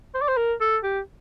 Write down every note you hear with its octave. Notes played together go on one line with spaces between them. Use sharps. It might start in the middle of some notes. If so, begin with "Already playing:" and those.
C5
D5
C5
A#4
A4
G4